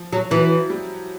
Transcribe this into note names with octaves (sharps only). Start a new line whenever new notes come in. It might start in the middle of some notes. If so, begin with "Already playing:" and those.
Already playing: F3
F#3
E3 F#3
G3